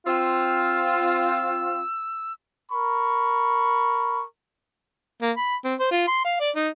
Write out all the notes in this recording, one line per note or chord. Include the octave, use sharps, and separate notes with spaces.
C4 F4 E6
A#4 B5 C#6
A#3
B5
C4
C5
F4
C6
F5
D5
D#4